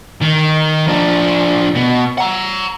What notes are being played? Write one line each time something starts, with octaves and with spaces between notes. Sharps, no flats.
D#3
F3 D4
B2
F#5 A#5